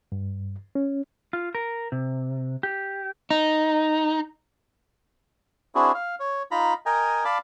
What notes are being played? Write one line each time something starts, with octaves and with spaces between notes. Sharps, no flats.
G2
C#4
F4
A#4
C3
G4
D#4
C4 D4 E4 F#4 G#4
F5
C#5
D#4 F4 A#5 B5
A#4 D#5 G5 G#5 A#5
D5 F5 A5 B5 D6